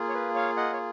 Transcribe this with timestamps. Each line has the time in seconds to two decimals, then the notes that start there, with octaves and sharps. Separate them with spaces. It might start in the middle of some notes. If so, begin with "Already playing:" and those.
Already playing: A#3 F4 G#4
0.09 C#5
0.14 B4
0.35 C#5 F5
0.57 D#5 F#5
0.73 C#5